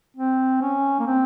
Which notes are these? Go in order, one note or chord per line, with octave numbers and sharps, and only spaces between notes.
C4
C#4
A#3
C4